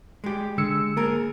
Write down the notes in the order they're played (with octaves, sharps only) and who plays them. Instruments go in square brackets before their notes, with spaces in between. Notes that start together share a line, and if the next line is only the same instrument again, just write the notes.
[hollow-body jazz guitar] G#3 G4
[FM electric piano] D3 E6 C#7 [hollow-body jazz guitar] G#3
[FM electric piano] A#3 [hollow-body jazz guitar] G#4 A#4